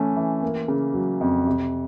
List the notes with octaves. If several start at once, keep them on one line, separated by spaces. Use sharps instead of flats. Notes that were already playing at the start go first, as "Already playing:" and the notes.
Already playing: E3 A3 C#4
E3
A#3
C#3
F#3
F2
C3